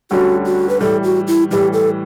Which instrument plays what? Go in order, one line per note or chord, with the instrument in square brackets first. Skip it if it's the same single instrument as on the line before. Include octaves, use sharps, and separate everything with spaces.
[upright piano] D2 D3 G3 C#4 [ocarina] F#4
[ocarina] F#4
B4
[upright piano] A2 E3 G3 [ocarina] A4
[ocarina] F#4
E4
[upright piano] A2 E3 G3 [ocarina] G4
[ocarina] A4